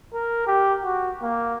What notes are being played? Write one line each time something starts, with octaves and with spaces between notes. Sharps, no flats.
A#4
G4
F#4
A#3